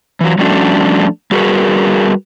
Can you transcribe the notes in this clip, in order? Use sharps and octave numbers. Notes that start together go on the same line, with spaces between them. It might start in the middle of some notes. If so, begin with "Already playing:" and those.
E3 F#3
F3 G3 A3 C#4 D4 F#4
G3 F#4 G#4 A#4 B4